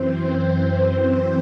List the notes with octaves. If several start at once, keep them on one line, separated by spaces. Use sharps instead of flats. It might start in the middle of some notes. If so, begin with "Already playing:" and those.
Already playing: F#2 E3 C4 C5